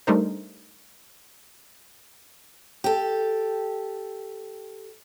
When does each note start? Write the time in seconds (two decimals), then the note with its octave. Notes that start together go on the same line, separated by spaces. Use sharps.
0.07 G3 A3 D4 D#4 A#4 C5
2.84 G4 A4